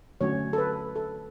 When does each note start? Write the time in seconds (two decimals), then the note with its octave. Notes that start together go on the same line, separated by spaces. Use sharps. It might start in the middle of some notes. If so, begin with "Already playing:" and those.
0.21 D3 F#3 A3 C#4 C#5
0.53 A4
0.58 B4
0.96 A4